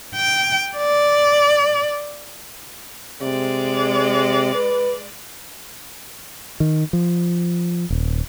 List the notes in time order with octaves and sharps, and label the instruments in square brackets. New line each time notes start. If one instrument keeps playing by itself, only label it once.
[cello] G5
D5
[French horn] C3 [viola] G#3 D5
[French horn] B4
[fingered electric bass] D#3
F3
D#1